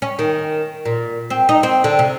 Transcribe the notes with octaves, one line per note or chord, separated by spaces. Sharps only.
C#4
D#3
A#2
C4
D#4
C4
D3
C3